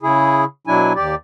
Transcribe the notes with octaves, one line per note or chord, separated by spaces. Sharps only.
C#3 E4 G#4
B2 F#3 D4 E4 G#5
D#2 G4 D5